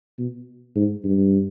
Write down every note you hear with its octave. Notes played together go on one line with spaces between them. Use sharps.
B2
G#2
G2